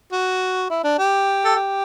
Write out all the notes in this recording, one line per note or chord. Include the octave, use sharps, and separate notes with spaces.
F#4
E4
D4
G4
A4
G4